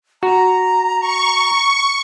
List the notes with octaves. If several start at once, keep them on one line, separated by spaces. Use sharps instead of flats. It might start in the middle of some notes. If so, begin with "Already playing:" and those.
F#4 A#5
C#6